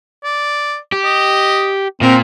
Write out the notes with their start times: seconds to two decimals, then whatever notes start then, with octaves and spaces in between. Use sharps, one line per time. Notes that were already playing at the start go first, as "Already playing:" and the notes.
0.24 D5
0.92 G4
1.04 D#5
2.01 A#2 C4 A#4